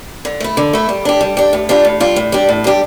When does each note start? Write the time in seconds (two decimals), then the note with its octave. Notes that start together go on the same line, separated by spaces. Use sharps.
0.25 D3
0.40 A3 E4
0.57 D3
0.73 A3 E4
0.89 G3
1.05 D4 G4
1.21 G3
1.37 D4 G4
1.53 A2
1.69 G3 D4 F4
1.85 A2
2.00 G3 D4 F4
2.16 A2
2.32 G3 D4 G4
2.49 A2
2.64 G3 D4 G4